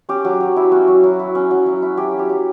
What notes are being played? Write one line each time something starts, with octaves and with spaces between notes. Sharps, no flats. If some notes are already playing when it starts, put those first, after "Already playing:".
C#4 G4
F#3
F#3
E4
C#4 F#4
F#3
F#3
E4
C#4
F#3
F#3
E4
C#4 G4
F#3
G4
F#3